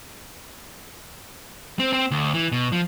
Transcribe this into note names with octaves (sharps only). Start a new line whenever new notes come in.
C4
C4
D2
E3
B2
F3